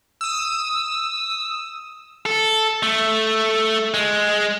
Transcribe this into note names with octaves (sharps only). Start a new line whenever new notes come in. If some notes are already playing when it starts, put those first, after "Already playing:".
D#6 E6
A4
A3
G#3